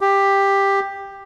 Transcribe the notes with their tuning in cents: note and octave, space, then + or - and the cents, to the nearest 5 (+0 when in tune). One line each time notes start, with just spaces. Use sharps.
G4 +10